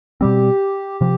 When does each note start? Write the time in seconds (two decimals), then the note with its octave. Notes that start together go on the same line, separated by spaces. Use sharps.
0.21 B2 G3 C4 G4
1.01 C3 F3 G4